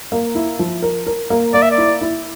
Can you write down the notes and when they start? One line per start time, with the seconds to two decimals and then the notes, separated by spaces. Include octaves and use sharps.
0.12 A#3
0.35 E4
0.59 F3
0.82 A#4
1.07 A#4
1.30 A#3
1.54 A#3 D5
1.62 E5
1.71 D5
1.78 E4
2.01 E4